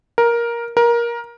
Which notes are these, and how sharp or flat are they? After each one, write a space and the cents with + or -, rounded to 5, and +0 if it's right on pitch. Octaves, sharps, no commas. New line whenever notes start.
A#4 +10
A#4 +20